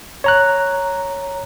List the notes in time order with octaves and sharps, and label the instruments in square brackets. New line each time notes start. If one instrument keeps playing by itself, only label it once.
[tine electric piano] C#5 A#5 F#6